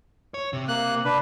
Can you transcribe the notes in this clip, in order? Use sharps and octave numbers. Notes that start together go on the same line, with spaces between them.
C#5
C3
A#3 F#6
D4 B4